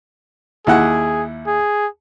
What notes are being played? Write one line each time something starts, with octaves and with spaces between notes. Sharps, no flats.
D#2 E4 G#4 F#5
G#4